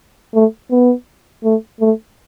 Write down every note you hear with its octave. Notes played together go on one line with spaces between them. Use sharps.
A3
B3
A3
A3